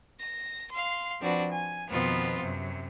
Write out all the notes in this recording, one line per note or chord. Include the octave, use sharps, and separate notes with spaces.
A#6
F5 C6
F3 C4 D4 F#4 B4 D5
G#5
F2 B2 D#3 B3 C4 F4
F#2 C3 F#3